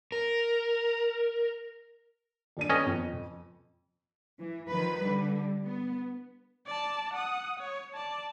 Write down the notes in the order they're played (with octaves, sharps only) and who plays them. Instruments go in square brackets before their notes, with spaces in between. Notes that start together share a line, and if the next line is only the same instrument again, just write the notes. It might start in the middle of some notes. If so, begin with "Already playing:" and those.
[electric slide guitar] A#4
[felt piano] D#1 D4 D#7
[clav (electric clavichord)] C#4 D#5 [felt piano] A4 B4 G5
[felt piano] F2
[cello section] E3
D#3 F3 B4
D3 G3
B3
[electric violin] D5 A5
F#5 D#6
C#5
D5 A5